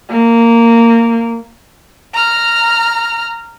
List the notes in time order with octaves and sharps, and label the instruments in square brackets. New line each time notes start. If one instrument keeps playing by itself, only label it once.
[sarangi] A#3
[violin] A#5 F6